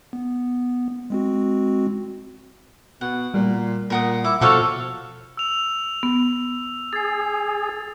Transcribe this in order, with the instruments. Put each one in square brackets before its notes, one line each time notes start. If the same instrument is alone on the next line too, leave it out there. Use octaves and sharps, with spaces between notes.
[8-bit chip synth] B3
G#3 C4 F#4
[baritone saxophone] B2 [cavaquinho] F#5
[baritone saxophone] A#2 [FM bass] G3
[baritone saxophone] A#2 [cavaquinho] A#4 F#5 D#6
[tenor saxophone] E4 [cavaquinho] D6
[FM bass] B2 [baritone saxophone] F3 [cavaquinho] F#4 C#5 F5 [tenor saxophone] A4
[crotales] E6 F7
[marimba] B3
[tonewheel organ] G#4 [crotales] A6 C7